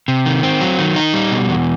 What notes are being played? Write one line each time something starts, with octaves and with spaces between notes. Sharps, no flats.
C3
D#3
C4
F#3
D#3
D#4
G3
B2
E2